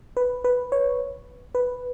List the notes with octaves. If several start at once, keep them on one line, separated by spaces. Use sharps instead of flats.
B4
B4
C#5
B4